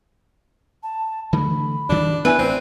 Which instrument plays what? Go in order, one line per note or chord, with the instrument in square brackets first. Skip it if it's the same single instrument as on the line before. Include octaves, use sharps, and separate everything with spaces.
[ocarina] A5
[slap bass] D3 E3 A3 [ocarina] B5
[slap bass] D2 G2 D#3 [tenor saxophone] D4
[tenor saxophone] E3 [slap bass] B3 D4 [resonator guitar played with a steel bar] B4 G#5
[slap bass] A1 [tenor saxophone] C4 [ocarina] D5